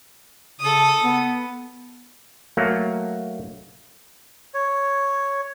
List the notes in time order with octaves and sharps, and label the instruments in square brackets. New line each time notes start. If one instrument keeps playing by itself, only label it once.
[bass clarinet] C#3 [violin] A4 D#6
[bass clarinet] B3
[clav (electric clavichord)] F#3 A3 A#3
[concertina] C#5